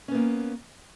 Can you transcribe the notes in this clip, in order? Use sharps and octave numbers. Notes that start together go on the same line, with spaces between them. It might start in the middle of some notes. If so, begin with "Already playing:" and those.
A#3 B3 C#4